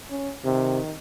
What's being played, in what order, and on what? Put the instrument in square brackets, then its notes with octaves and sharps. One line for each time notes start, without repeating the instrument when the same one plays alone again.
[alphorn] C#4
[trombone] C3 [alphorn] D#3